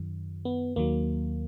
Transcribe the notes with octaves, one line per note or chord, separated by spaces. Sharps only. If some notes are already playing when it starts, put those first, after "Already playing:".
Already playing: F#2 D#3 F#3
B3
D#2 D#3 F#3 A#3